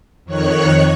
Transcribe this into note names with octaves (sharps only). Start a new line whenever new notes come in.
F2 D#3 C#5 C#6 F#6